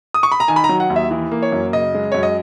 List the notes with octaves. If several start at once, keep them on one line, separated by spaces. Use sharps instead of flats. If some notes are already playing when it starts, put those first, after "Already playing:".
D#6
C#6
B5
A#5
D#3 G#5
B5
A#5
F#3
F#5
D#2
E5
E3
A#3
C#5
F#2
C#3 D#5
G#3
F#2 C#5
D#5